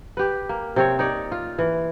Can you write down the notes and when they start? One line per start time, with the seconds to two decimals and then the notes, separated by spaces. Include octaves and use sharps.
0.17 G4 B4
0.49 A#3
0.76 C3 C4 C#5
0.99 D#4 C#5 D5
1.32 F4
1.59 E3